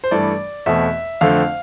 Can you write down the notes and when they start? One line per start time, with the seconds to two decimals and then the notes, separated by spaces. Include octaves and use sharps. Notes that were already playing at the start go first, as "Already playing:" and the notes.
0.04 C5
0.11 G2 E3 A3 D5
0.66 E2 B2 A3 C4 E5
1.21 F2 D3 A3 C4 F5